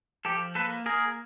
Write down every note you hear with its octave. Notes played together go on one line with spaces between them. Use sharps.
F3 G4 A4
A#3 A4 B4
A#3 G#4 A#4